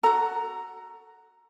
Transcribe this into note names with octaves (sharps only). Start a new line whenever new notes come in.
F#4 A4 A#5